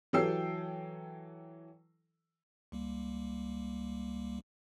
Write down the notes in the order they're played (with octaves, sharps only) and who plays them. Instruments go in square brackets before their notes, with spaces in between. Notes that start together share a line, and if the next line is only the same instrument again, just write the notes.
[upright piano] E3 F#3 A4 G5 E6 C7
[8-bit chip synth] C#2 G3 A#3